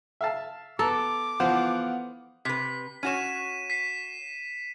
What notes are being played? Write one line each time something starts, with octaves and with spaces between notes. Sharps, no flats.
E5 F5 A5
B3 A4 A#5 D6
E3 F3 B3 C5 F5 F#5
C3 B4 B6
C#4 F#4 C#5 D#7 E7
B6 C7